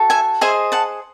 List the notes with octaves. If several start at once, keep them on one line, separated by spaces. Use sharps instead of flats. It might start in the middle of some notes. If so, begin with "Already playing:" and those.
Already playing: F#4 A4
E5 G#5
G#4 C5 D#5 E5 G#5
F#5 A5